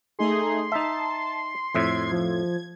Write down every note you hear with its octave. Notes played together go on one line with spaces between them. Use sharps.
A3 D#4 G#4 C6
D#4 E5 A5
F2 A2 E5 G#6
F3